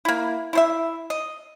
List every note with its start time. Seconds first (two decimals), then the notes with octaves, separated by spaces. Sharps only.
0.05 A#3 E4
0.53 E4 C5 E5
1.10 D#5